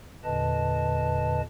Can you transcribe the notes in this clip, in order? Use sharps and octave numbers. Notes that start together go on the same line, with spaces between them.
E2 A#2 D3 B4 D#5 A5